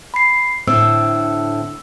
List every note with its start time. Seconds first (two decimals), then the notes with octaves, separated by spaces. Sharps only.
0.14 B5 C7
0.68 A2 D3 C4 E6